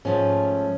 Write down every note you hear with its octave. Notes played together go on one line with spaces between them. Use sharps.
G#2 F3 A3 C#4